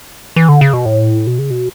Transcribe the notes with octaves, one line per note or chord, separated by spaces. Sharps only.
E3
D3
C#3
B2
A2
B2
C#3
B2